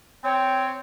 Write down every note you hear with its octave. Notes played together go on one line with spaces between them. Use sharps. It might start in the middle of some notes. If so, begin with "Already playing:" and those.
C4 C#5 G5